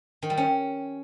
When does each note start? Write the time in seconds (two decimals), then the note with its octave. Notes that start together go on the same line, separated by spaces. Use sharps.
0.22 D#3
0.30 G3
0.37 C#4